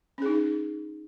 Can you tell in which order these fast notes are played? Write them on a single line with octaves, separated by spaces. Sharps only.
C#4 G#4 D#4